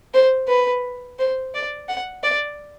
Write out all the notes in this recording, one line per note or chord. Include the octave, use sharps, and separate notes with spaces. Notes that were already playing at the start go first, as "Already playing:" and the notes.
C5
B4
C5
D5
F#5
D5